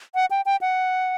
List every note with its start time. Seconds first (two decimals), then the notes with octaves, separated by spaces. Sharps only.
0.15 F#5
0.31 G5
0.46 G5
0.61 F#5